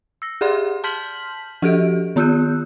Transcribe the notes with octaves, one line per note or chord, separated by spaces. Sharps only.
E6 A#6
G4 G#4 D5 F#5 C6
A5 C6 F6 G6 B6 F#7
F3 F#4 G4 A4 D7
D#3 B3 F4 E6 F#6 G6